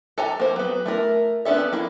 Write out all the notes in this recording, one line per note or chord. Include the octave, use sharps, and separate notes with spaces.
A4 G#5 A#5
A#3 C5
F#3 B3
A3 E4 A#4
B3 C#4 D4 A4 E5
A#3 E4